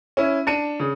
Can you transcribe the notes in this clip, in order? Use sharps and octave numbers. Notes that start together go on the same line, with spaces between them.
C#4 E4
D4 A5 C#7 D#7
C#3